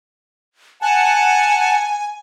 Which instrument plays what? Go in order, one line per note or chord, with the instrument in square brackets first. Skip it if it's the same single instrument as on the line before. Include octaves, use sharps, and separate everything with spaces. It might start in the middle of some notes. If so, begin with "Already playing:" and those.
[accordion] F#5 A5 [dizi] G#5